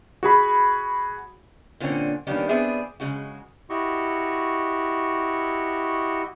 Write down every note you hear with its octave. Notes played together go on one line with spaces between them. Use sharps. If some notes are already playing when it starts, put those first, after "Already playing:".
F#4 G#4 B5
A#2 D3 C4 C#4
D#3 G3 A#3 B3 C#4 D4
B3 C4 D4 G#4 D5 E5
C#3 G#3 F#4
E4 F#4 G4 D#5 C#6